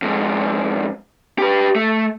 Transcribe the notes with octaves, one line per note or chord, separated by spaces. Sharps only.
F2 G#2
G4 B4
A3